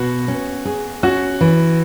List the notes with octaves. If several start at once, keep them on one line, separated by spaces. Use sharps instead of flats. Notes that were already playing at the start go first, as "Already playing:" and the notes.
Already playing: B2 F#4
C#4
G#4
C#4 F#4
E3